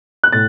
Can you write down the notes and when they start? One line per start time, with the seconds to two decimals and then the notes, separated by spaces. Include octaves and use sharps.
0.24 F#6
0.32 A2 A6